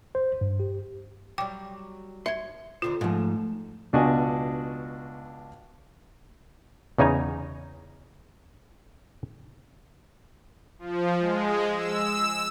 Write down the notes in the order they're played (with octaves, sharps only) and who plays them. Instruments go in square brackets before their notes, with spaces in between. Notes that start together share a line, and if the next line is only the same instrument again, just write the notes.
[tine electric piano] C5
G2
G4
[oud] F#3 G3 [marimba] G5 D6
[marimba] E5 G#6 [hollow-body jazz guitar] C6
[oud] D#2 D3 C4 [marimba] F4
[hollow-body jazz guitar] G#2 F3 [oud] A3 D#4
[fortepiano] C#2 B2 D4 F#4 D#5 G#5
[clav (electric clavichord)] E2 C#3 D#4 G#5 A#5
[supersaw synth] F3
G#3
E6